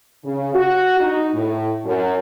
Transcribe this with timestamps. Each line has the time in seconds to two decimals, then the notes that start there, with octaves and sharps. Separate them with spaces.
0.23 C#3
0.54 F#4
1.00 D#4
1.33 A2
1.85 F#2